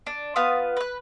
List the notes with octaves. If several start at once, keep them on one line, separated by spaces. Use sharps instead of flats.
D4
B3 F4 B4 D#6
B4 F#6